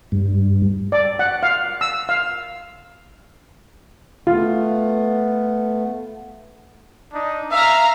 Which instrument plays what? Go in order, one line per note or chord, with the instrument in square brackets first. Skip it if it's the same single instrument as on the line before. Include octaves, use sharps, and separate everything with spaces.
[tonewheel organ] G2
[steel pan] D5
F#5
F5
E6
F5
[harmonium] A3 B3 [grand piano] F4
[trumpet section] D4 D#4
[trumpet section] E5 [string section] F5 A#5